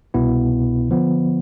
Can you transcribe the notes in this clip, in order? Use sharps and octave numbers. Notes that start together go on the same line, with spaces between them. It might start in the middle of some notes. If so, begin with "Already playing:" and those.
C2 B2 B3 E4
D3 F3 B3